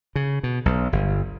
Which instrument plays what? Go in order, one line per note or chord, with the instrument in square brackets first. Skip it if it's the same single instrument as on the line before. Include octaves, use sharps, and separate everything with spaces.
[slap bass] C#3
B2
B1
G1